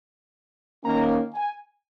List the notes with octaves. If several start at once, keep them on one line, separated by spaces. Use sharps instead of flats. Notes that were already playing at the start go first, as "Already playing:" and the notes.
D#3 A#3 C#4 A#5
G#5